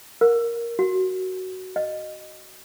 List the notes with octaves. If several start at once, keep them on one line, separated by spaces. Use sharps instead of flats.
A#4
F#4
D#5